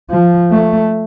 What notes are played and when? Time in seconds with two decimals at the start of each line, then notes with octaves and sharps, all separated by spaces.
0.10 F3
0.51 A3